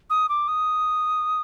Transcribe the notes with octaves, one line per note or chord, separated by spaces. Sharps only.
D#6
D6
D#6